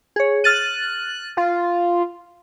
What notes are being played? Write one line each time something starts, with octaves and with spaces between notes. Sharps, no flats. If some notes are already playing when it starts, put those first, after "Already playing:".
G#4 C#5
F6 F#6 A6 D#7
F4